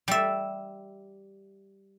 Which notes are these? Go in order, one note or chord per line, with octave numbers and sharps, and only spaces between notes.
G3 E5